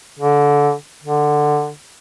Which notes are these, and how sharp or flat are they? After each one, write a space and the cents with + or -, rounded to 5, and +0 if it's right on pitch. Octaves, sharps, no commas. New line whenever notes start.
D3 -20
D3 +15